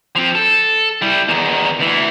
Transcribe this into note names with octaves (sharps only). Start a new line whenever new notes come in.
F3 C4
A4
G3 E4
E2 D#3
D2 E3